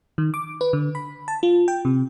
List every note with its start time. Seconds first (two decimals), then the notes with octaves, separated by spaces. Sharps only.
0.18 D#3
0.34 D6
0.61 B4
0.73 D3
0.95 B5
1.28 A5
1.43 F4
1.68 G5
1.85 C3